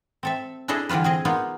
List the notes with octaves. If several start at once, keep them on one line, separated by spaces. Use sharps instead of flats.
C4 A4 E5
D4 E4 G#4 A4 D#5
D3 E3 G3 F4 B4
C4 G#4 D#5
A#3 B3 D#4 F4